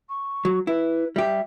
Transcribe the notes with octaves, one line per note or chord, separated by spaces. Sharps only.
C#6
F#3
E4 B4
G3 G4 E5